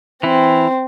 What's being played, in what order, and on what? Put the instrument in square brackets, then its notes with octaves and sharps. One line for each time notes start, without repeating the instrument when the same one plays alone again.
[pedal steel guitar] E3 E4 [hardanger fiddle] C4